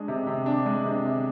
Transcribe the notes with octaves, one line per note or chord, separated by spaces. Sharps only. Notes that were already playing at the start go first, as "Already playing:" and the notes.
Already playing: G#3 D4
C3
C3
D4
G#3
C3
C3